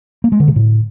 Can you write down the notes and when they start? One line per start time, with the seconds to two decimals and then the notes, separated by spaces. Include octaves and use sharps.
0.24 A#3
0.32 G#3
0.40 D3
0.48 C3
0.56 A2